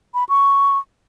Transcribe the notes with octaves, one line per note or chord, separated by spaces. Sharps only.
B5
C#6